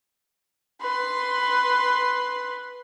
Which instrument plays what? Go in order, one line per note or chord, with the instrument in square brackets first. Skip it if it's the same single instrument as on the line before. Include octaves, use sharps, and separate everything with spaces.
[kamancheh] B4 C6